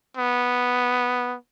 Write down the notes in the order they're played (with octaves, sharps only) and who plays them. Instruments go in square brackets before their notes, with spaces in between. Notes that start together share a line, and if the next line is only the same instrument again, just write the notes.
[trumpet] B3